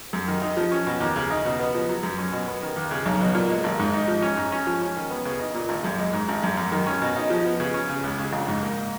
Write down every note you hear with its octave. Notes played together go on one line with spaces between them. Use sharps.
F#2
D#3
D#4
F3
C#4
B2
D#2
C#3
D#4
B2
B3
F3
F#3
F#2
C#4
B2
B3
D#3
D#2
C#3
B1
B2
A#2
G#3
G#1
G#2
D#4
F3
C#4
G#2
C#4
F3
C#4
D#3
B3
C#3
D#4
A#2
G#1
F#2
G#3
G#2
G#1
F#2
F#2
D#3
C#4
B2
D#4
F3
B3
C#3
C#4
C#3
C#2
C#3
A#1
G#2
A#3